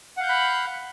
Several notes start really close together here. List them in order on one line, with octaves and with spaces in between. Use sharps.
F#5 F5 G6 F#6 B5